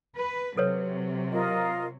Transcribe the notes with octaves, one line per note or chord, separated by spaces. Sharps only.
B4
C3 F#3 A4 B4 C#5
F4 A#4 D#5